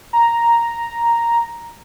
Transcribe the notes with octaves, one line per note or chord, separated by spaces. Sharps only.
A#5